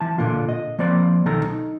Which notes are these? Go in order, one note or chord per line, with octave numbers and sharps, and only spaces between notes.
E3 A5
A#2 D3 A#3 F4
D#5
F3 A#3 C4 D5
B1 D#3 A4 A#5
D#4